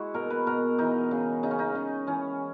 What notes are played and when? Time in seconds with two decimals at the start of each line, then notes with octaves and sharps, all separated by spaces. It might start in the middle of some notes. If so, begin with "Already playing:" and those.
Already playing: G#3 E4 F#4
0.14 B2 A#4
0.30 B4
0.47 B2 A#4
0.79 E3 D#4
1.11 C#3
1.43 C#3 D#4
1.51 C#4
1.59 D#4
1.75 C#3
2.07 E3 C#4